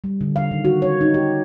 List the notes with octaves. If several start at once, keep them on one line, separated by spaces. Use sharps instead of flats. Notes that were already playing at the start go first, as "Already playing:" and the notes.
G3
D3
F5
D#3
F#4
C#5
D#4
G4